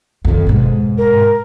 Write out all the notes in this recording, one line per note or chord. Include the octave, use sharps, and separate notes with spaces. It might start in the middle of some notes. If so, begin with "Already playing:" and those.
F2 D#3
G#2 B2
A#4